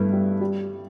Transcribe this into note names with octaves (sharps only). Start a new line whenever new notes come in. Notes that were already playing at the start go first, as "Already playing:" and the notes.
Already playing: G2 A3 B3 E4
G3
G3